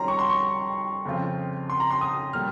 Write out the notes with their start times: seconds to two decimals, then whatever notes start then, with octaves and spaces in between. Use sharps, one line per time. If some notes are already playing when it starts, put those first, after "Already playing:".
Already playing: F2 D#3 G3 C#4 F4 A#5 C6
0.08 C#6
0.19 C6
0.30 C#6
1.05 F2 C#3 F3 C4 F4
1.70 C6
1.80 A#5
1.91 C6
2.01 D#6
2.33 A#2 G3 F6